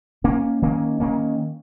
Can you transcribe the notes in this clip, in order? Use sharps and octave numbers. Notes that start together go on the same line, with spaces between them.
D#3 A#3 C#4
D#3 A#3 C#4
D#3 A#3 C#4